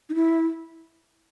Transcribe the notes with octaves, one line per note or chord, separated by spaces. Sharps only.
D#4
E4